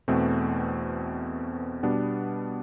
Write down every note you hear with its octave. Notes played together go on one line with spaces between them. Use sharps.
E2 B2 A3 C4
B2 G3 B3 D4